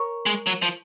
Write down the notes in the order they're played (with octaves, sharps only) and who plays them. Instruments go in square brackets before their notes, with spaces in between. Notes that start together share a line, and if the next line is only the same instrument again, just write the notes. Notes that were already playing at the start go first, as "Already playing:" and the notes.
Already playing: [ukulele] A#4 C#5
[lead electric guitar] G#3
F#3
F3